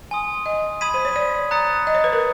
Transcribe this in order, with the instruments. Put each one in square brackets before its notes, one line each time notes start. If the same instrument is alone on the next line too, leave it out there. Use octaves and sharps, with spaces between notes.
[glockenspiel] G#5 C6 D#6
[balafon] D#5
[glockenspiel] B5 D#6 G#6 B6 D#7
[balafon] C5
C#5
D5
[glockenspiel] A#5 D#6 F#6 A6 C#7
[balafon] D#5
C#5
B4
A#4